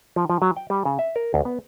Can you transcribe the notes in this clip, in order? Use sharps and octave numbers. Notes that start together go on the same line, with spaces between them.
F3
F3
F#3
G5
G3
C#3
E5
A#4
D2
B3